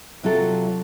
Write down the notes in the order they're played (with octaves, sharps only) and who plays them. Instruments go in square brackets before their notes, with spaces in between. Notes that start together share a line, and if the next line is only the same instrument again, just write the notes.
[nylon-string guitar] C3 F#3 F4 F#4 A4